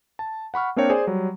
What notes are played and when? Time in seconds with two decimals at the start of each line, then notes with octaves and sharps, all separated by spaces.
0.19 A5
0.54 F#5 B5 C#6 F6
0.76 A#3 C4 D4 A#4 C#5 G5
0.90 G#4 C5 D5 G#5
1.07 F#3 G3